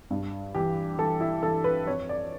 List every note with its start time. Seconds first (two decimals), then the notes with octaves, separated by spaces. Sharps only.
0.11 G2
0.55 E3 G4
0.98 E3 A4
1.21 E4
1.43 E3 A4
1.64 B4
1.86 F2 C#5
2.09 D5